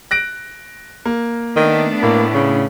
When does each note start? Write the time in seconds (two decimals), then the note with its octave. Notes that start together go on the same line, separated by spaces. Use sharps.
0.11 F#6 A#6 D7
1.06 A#3
1.56 D#3 A3 B3 D4
2.03 A2 A#3
2.34 C#3